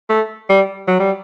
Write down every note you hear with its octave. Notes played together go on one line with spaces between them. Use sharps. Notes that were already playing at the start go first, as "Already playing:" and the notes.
A3
G3
F#3
G3